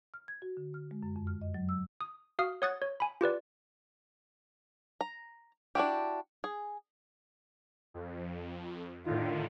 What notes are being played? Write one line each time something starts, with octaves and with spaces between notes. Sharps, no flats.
F6
G#6
F#4
D3
F6
G#3
F#2
F2
F6
D#5
F#3
E6
D#6
F#4 F5 D#6 F6
C#5 F#5 D#6 F#6 G#6 A6
C#5
G#5 B5
F4 G4 B4 D5
A#5
D4 E4 F#4 G4
G#4
F2
A2 D3 D#3 F4